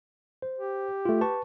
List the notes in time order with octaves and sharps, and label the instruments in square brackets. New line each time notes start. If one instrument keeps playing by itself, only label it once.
[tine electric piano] C5
[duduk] G4
[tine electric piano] A3 F4
B4 A5 C#6